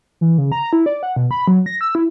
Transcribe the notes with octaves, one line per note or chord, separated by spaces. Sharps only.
E3
C#3
A#5
E4
D5
F#5
B2
B5
F#3
A#6
E6
E4